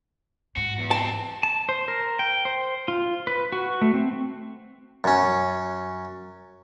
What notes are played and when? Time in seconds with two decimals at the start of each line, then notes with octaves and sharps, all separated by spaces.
0.57 G#2 F#4
0.78 E2
0.91 C4 D4 A5
1.43 A5
1.69 C5
1.88 A#4
2.19 G5
2.45 C5
2.88 F4
3.27 B4
3.52 F#4
3.82 A3
3.94 C4
5.04 F#2 C#4